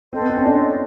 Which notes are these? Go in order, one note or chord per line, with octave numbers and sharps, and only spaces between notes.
C4 A4 C5 D#5
B3
C4
C#4
D4